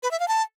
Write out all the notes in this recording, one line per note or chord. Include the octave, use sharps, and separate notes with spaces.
B4
E5
F5
A5